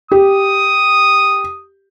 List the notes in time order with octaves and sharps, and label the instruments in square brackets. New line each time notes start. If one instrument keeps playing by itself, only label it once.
[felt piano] G4 [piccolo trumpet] D#6